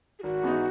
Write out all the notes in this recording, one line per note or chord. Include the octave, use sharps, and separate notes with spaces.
G#4
G#1 F#4
G#2 E3 B3 D#4